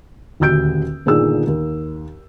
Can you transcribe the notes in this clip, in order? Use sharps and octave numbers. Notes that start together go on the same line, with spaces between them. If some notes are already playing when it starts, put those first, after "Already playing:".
D#1 D2 F#4 E6 G6 D7
G1 A#2 D3 D#3 G#4 E6
D#2